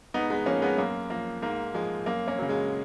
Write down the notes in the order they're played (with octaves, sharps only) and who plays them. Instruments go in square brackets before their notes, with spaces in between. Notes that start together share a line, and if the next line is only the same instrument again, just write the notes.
[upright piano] G#2 B3 D#4
G#3 B3
F3 A#3 C#4
G#3 B3
F#2 A#3
F3 A#3
G#2 A#3
F3 G#3
F#2 A#3
A#3 C#4
C#3 F#3
G#3